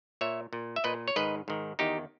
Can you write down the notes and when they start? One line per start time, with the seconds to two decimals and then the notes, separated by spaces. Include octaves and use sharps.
0.21 A#2 C#5 E5
0.53 A#2
0.76 E5
0.84 A#2 B4 D#5
1.08 C#5
1.16 G#2 D#3 B4 D#5
1.48 G#2 D#3
1.79 E2 D#3 D#4 G4